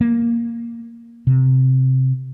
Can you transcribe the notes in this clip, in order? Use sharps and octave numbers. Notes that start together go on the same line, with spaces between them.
A#3
C3